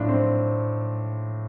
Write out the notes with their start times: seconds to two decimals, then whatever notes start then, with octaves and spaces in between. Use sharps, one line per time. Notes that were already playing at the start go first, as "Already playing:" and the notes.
Already playing: A2 F3 D4
0.09 C4